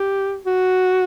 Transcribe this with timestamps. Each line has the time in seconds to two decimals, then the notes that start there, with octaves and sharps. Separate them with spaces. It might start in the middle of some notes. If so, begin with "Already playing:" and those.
Already playing: G4
0.45 F#4